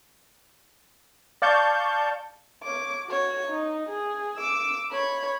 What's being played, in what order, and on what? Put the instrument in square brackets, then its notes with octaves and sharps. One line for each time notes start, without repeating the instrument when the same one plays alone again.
[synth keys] D5 F5 A5 C#6 G6
[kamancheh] C#5 D6
F#4 C#5
D#4
G#4
D6 E6
C#5 B5